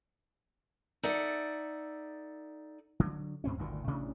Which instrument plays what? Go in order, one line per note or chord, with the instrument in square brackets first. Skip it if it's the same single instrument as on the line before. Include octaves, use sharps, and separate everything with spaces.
[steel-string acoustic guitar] D#4 A4 D5 E5 F#5
[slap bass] D3 F#3
D#2 G#2 C4 C#4
G1 D2 A#2 D#3
A1 C3 C#4 D4